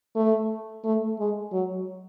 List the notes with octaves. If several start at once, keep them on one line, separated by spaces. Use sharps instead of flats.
A3
A3
G#3
F#3